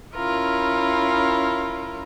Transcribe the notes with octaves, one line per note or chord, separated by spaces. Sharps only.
C#4 E4 F4 A#4